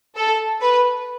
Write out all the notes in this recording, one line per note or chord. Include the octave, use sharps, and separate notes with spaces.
A4
B4